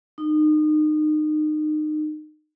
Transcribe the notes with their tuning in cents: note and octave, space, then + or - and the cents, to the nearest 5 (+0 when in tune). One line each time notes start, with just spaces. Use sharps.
D#4 -30